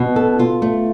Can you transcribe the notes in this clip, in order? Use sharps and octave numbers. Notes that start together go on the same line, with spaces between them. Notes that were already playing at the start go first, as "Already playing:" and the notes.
Already playing: B2
A4
F4
A3